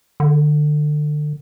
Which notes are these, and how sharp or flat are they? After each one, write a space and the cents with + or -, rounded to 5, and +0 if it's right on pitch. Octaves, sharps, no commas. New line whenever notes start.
D3 +30